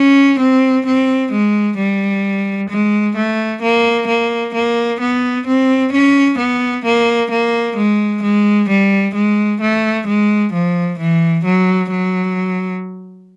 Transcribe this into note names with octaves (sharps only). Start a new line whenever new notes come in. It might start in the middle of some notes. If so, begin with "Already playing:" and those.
Already playing: C#4
C4
C4
G#3
G3
G#3
A3
A#3
A#3
A#3
B3
C4
C#4
B3
A#3
A#3
G#3
G#3
G3
G#3
A3
G#3
F3
E3
F#3
F#3